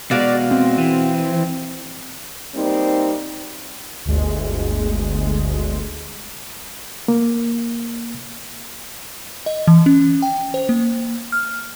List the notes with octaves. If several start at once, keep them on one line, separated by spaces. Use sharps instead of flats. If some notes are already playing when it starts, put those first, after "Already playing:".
B2 G#3 F#4 D5 F5
C4
E3
G3 A#3 C4 D#4
G1 D2 G#3
A#3
D#5
E3
C#4
G5
C5
A#3
F6